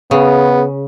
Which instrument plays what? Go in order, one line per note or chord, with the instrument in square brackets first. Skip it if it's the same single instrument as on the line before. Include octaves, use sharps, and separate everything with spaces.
[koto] C#3 [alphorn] B3